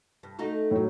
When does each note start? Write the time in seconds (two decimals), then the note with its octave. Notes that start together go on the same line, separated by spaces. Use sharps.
0.23 G2
0.39 A3 D#4 F#4
0.71 A2 F#3